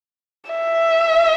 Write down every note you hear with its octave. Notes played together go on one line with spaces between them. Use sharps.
E5